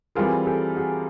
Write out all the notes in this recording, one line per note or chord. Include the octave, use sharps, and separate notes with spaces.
E3 G3 C4 F4 G#4 A#4
G4 A4
F#4 G#4